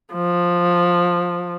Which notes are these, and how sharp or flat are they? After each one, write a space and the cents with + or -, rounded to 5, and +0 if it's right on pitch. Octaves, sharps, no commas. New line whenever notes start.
F3 +5